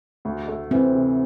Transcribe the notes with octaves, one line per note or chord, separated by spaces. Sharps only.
D2
A3
E3 C4
C3